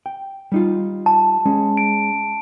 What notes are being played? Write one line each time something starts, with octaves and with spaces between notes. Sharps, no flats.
G5
G3 D#4 F4
A5
G#3 C#4
D7